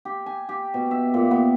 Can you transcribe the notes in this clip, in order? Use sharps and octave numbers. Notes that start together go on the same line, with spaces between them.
G4
G#5
G4
B2
E5
A#2
B3